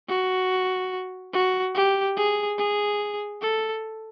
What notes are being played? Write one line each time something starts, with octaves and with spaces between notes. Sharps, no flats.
F#4
F#4
G4
G#4
G#4
A4